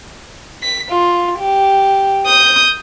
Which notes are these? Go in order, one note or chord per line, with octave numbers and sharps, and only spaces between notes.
B6
F4
G4
D#6 G6